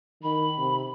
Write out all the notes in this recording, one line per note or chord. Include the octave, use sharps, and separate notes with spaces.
D#3 B5
C3